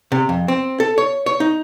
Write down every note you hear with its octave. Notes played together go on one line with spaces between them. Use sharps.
C3
F2
C4
A4
C#5
C#5
D#4